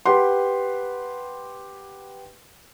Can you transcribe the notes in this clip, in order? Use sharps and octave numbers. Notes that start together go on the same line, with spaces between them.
G4 B4 F#5 C6